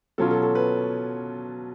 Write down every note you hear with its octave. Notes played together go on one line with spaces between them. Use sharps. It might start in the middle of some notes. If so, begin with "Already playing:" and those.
B2 F#3 C#4 F4 A4
A4
A4
B4